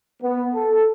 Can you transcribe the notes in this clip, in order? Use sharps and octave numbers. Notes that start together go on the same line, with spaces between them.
B3
A4